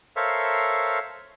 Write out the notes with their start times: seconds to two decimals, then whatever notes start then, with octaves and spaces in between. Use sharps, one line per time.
0.16 A4 A#4 C5 C#5 E5 F5